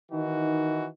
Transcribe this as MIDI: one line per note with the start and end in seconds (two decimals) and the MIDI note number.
0.12 0.88 51
0.12 0.88 52
0.12 0.88 63
0.12 0.88 66